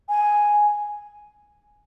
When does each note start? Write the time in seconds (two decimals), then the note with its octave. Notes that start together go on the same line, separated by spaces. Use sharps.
0.08 G#5